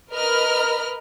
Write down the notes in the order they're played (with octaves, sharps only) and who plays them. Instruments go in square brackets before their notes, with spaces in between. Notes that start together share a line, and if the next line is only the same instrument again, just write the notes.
[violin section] A#4 B4 D#5 B5 F6